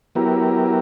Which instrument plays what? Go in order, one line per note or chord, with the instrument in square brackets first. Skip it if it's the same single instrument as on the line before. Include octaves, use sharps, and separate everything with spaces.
[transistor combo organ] F#3 B3 E4 G4 A#4